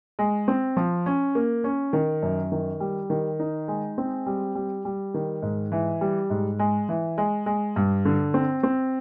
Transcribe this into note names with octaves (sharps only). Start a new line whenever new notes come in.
G#3
C4
F3
C#4
A#3
C#4
D#3
F#2
D#3
G3
D#3
D#4
G#3
C4
G3
G3
G3
D#3
G#2
E3
G3
G#2
G#3
E3
G#3
G#3
G2
D3
C4
C4